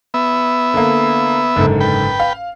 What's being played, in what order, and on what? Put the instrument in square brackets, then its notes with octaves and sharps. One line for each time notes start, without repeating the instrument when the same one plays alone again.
[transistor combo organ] B3 E5
[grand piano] D3 A#3
F#1 G#2 D3
[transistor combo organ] B4 G5
[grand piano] F5